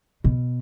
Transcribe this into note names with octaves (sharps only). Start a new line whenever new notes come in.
B2